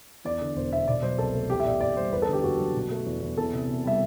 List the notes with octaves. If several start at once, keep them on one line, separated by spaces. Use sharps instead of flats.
E2 D5
D3
E1 C5
E1 E5
B2 D5
F#3 C5
C2 A4
A3
E2 G4
E5
B2 D5
F#1 D5
G3 C5
E2 B4
A4
D3
G4
F#1 F#4
F#3
B2
A3
E2
E2
E2 A4
C3
E1
G3 E5